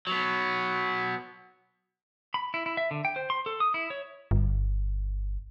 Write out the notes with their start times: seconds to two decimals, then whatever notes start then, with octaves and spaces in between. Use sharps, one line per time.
0.07 F#3 B3
2.34 B5
2.54 E4
2.66 E4
2.77 E5
2.91 D3
3.05 G5
3.16 C5
3.30 C6
3.46 A4
3.60 D#6
3.74 E4
3.90 C#5
4.31 G1